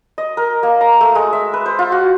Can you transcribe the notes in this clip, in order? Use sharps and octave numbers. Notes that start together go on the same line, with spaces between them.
D#5
A#4
A#3
A#5
A3
G#3
E5
B4
C5
F4
F#4